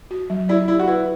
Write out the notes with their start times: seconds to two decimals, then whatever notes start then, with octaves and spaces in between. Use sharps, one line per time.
0.11 F#4
0.30 F#3
0.49 E4 D5
0.68 E4 G4
0.79 F#4
0.87 E4 B4